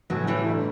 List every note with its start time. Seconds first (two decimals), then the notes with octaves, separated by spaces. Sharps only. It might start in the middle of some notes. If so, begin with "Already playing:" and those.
0.10 A2 E3 F#3 A3
0.27 E3 G3
0.46 G1 D3